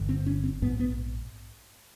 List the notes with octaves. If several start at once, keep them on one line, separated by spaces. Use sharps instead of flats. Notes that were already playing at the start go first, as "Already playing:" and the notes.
Already playing: G1 G2 D3
C4
C#4
C4
A#1 G#2 B3
B3